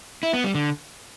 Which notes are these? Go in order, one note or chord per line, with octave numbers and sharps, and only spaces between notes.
E4
B3
G3
D3